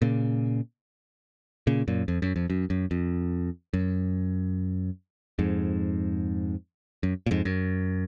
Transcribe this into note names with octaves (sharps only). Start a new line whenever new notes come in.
A#2 C#3
A#2 C#3
F#2 A#2
F2
F#2
F2
F#2
F#2
F2
F#2
F2 G#2
F#2
A#2
F2 G#2
F#2